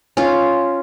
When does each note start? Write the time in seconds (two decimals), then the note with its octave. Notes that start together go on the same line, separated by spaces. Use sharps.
0.17 C#4 F4